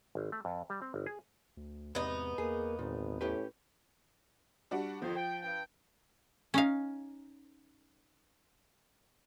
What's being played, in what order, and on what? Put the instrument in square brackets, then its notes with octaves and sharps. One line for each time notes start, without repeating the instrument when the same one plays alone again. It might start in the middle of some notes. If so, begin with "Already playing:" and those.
[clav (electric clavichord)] G#1
A3
F2
G3
C4
G1
G#4
[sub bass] D2
[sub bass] E2 [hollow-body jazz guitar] G#2 C3 [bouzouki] B3 D#4
[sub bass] E2 [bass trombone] A#3 [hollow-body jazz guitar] G#4
[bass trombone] G#1 [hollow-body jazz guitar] A#2
[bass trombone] A2 [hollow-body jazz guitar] C#4 G4 B4
[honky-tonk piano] G3 D4 F#4
[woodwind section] F2 D#3 C5 [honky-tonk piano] F3
[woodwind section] G5
G2 G5
[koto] C#4 D#4 F5